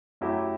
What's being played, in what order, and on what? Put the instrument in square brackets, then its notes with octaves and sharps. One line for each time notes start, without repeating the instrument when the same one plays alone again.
[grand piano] F#2 F#3 A3 E4 G4